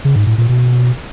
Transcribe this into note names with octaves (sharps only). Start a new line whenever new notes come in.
C#3
G#2
A2
A#2
B2